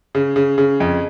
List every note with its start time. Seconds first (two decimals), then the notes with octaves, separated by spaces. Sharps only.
0.15 C#3
0.36 C#3
0.58 C#3
0.80 F2